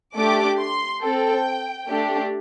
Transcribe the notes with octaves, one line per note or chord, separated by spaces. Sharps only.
A3 D4 G4 D6
C6
C4 A4 G5
A3 D4 G4